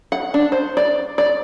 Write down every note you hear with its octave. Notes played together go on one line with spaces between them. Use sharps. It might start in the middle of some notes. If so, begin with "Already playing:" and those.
F#5
D4
C5
D5
D5